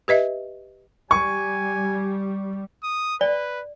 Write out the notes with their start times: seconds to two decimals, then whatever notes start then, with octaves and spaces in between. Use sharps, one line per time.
0.08 G4 B4 D#5 E5
1.11 G3 G#5 C#6
2.83 D#6
3.21 B4 D5